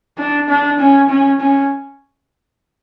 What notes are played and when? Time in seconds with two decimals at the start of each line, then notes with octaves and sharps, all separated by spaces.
0.18 D4
0.49 D4
0.79 C#4
1.10 C#4
1.41 C#4